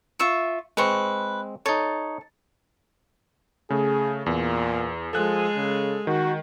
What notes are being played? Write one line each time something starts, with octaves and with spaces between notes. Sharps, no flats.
F4 E5 C#6
G#3 C4 B4 C#6
D#4 A4 C#5
C#3 A3 G#4
E2 A#2
F3 G#3 G#4 A4 F#6
C#3
D#3 F#4